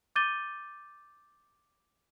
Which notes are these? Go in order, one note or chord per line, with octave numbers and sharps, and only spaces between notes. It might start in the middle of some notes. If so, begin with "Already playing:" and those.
D6 G6 A6 D#7 G7